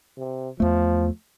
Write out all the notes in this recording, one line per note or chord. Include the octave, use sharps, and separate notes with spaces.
C3
E2 F3 A3